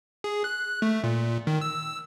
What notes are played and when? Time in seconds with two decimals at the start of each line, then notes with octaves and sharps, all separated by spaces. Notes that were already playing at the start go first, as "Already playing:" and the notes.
0.24 G#4
0.44 F#6
0.82 A3
1.04 A#2
1.47 D#3
1.61 E6